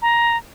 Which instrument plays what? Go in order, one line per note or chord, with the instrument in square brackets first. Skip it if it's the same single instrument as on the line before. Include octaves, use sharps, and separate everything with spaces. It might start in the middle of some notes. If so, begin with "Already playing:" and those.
[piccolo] A#5